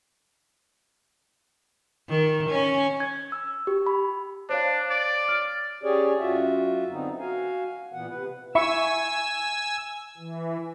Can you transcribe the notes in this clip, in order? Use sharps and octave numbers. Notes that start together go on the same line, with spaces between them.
D#3
C#4
G#6
E6
G4
B5
D4 C5 C#5 F5
D5
F6
C#4 G4 G#4 C#5 D5
F#2 F4 F#4 E5
D3 B3 C4 D#4
F#4 F5 G#5
A#2 E3 B3 F#5
C3 B4
E4 E5 G#5 C#6 E6
E3